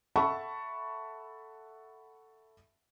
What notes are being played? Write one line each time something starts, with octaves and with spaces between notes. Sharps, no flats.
A4 E5 F#5 A5 B5 C#6